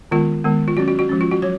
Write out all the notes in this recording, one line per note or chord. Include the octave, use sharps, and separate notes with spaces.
D#3 G#3 B3 F4
D#3 G#3 B3
F4
F#3 C#4 F#4
F#4
F#4
F3 G#3 C#4
F4
F#4
F#3 C#5